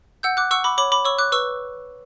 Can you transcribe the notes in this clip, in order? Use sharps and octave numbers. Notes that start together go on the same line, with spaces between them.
F#5 E6 G6
D6 F#6
F#5 C#6 E6
B5 D6
C#5 B5 D6
B5 D6
C#5 C#6 E6
D6 F#6
B4 C#6 E6